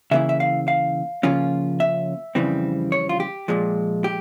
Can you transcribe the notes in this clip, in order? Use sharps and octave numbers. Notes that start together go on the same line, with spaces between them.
C#3 E3 A#3 E4 E5
E5
F5
F5
C#3 F3 A#3 C#4 F4
E5
F2 C#3 E3 G3 C4
C#5
F4
G4
A#2 F3 G#3
G4